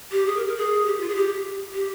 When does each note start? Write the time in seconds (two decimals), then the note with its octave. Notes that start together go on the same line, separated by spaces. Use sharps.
0.12 G4
0.26 G#4
0.36 A#4
0.47 A#4
0.56 G#4
0.86 G4
1.00 F4
1.09 G#4
1.15 G4
1.74 G4